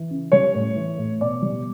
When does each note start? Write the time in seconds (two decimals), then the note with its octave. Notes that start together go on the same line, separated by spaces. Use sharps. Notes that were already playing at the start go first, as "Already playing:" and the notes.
Already playing: E3
0.11 C#3
0.32 G3 C#5
0.55 A2
0.76 E3
0.98 A2
1.21 B2 D5
1.42 G3